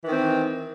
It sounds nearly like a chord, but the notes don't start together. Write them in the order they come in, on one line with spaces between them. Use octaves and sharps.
E3 D#3 C4